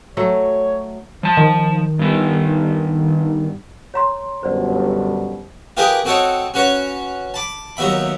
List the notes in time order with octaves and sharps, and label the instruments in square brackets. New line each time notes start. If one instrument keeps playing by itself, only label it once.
[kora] F#3 A3 [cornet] C#5
[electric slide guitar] F3 A5
[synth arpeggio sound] D#3
[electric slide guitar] G2 B3
[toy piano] C#5 A#5 C6
[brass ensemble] G1 F#2 B2 [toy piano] C5 D5
[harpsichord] F4 G4 G#4 A#4 B4 D#5
C4 F#4 A4 C#5 D#5
C#4 F#4 B4 C#5
A5 B5 D6
D#2 F#3 B3 E5 B5